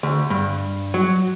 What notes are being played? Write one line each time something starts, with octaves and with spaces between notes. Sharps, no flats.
D2
G2
F#3